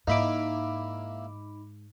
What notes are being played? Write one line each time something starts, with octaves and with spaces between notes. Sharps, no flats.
G#2 A#3 D#4 E4 B5 D6